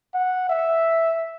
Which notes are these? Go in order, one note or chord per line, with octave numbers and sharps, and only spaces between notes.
F#5
E5